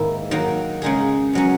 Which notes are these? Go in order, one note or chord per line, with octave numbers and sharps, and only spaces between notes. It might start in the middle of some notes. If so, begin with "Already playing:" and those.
Already playing: G#2 D#3 A#3 E4
D#3 F#3 A#3
C#3 G#3 D#4 G#4
B2 F#3 C#4